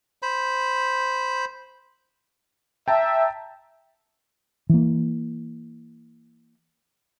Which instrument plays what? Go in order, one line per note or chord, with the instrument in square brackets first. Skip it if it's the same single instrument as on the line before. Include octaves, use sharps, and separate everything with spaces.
[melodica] C5 B5
[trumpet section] E5 [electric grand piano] G5 A5 A#5
[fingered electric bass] E3 A#3